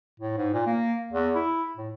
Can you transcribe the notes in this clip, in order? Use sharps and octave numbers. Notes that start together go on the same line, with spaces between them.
A2
G#2
A#2
A#3
E2
E4
A2